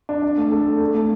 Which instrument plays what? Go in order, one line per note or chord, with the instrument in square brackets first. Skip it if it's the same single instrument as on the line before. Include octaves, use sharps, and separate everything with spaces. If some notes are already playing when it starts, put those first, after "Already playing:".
[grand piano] D4
D4
A3
A4
A4
A3
A3